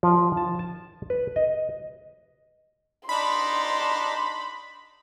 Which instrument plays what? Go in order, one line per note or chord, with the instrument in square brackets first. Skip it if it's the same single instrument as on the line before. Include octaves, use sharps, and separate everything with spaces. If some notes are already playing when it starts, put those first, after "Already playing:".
[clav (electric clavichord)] F3
A5
A5
B4
D#5
[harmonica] D4 D#4 [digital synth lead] B5 [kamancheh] C6